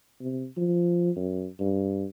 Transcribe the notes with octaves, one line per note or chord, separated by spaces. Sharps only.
C3
F3
F#2
G2